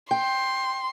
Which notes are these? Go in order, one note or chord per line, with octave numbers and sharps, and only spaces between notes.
G5 C6